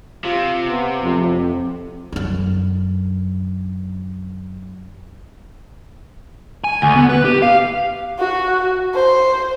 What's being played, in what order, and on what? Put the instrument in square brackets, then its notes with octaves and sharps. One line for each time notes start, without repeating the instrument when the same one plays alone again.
[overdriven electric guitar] C3 [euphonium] F4
[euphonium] B3
[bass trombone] F2 [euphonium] A2
[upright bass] F#2 D3
[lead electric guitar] G#5
D2
B3
B4
G4
F5
[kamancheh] F#4
C5